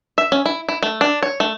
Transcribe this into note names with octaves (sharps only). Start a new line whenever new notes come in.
E5
C#4
E4
E4
A3
D4
C#5
A3